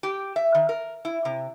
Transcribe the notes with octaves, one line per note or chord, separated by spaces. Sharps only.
G4
E5
D#3
A#4
E4
C3